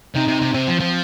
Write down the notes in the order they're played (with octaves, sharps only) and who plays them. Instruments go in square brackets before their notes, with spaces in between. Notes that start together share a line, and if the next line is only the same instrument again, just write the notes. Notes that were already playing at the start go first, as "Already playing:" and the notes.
[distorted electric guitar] C3 [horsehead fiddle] D#4
[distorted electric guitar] C3
C3
[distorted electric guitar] C3 [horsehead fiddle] C4
[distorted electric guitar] F3
F3